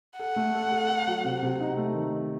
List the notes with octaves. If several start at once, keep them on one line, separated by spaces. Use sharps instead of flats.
A4 F#5
A3
A4
A4
A4
F#3
C3
C3
D#4
A3
D#3
D#4